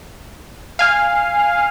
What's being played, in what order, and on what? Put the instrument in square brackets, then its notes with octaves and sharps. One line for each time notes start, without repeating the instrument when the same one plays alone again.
[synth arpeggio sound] F5 G#5 F6